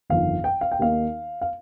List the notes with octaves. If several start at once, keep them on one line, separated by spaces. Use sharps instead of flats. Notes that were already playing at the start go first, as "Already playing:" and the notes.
G1 F2 D#3 F5
G5
F5
G5
D#2 D#3 A#3 D#4 F5
F5